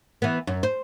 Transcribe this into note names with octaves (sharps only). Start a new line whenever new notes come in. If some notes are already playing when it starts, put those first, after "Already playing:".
E3 B3
F#2
C5